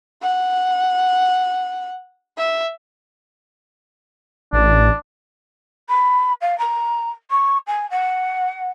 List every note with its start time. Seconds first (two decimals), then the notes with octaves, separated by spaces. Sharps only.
0.22 F#5
2.38 E5
4.53 A1 D4
5.89 B5
6.41 F5
6.58 A#5
7.30 C#6
7.67 G#5
7.90 F#5